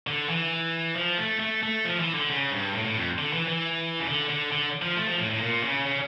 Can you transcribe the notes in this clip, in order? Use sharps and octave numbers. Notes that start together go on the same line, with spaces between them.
D3
E3
F3
A3
A3
A3
F3
E3
D3
C#3
G2
A2
A2
F2
D3
E3
E3
C#3
D3
D3
D3
F3
A3
F3
A2
A2
A#2
C#3
C#3